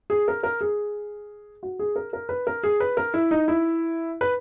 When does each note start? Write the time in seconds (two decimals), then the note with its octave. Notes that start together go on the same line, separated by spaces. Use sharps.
0.10 G#4
0.28 A#4
0.43 A#4
0.61 G#4
1.63 F#4
1.79 G#4
1.96 A#4
2.13 A#4
2.29 B4
2.47 A#4
2.63 G#4
2.80 B4
2.97 A#4
3.14 E4
3.31 D#4
3.48 E4
4.21 B4